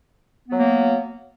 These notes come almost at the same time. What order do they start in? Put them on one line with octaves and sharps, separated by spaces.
B3 F#3 A#3